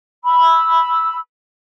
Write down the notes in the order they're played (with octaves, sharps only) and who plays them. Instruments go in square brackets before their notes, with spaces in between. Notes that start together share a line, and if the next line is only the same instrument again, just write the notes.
[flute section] B5 E6